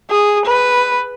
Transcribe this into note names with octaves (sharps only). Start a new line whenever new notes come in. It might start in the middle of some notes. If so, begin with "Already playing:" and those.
G#4
B4